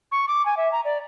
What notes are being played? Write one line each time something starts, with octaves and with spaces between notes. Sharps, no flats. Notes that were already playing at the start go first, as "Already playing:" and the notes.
C#6
D6
G#5
E5
A#5
D5